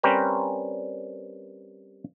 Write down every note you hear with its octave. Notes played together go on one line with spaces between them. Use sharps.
G3 C4 C#4 A#4 B4 G5